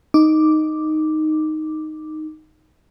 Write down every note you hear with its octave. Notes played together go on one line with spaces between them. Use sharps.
D#4 D6